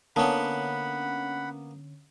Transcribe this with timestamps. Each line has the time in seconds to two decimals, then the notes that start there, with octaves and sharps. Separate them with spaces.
0.16 D3 A#3 B3 C#4 F#5 A5 B5 D#6